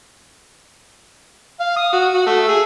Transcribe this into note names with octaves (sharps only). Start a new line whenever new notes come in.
F5
D#6
F#4
F#4
A3
G#4